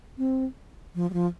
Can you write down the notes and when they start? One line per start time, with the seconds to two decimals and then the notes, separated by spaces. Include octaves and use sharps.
0.18 C4
0.95 F3
1.10 G3
1.13 F3